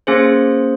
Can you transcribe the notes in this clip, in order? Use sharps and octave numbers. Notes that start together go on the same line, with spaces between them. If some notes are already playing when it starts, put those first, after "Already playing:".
A#3 C#4 G#4 C5